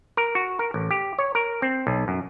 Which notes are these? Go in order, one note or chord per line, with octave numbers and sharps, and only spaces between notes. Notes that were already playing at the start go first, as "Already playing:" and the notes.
A#4
F#4
A#4
A1
G4
C#5
A#4
C4
B1
F#2